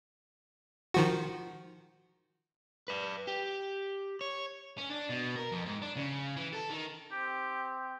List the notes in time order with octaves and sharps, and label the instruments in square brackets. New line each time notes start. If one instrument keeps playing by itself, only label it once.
[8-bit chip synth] D#3 F3 F#4
[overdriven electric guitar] B4 D5
G4
C#5
C#4
D4
B2
A#4
F2
G#2
D4
C#3
E3
A4
D#3
[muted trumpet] C4 [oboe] G4